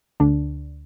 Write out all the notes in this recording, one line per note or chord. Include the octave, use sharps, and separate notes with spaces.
D2 D3 D4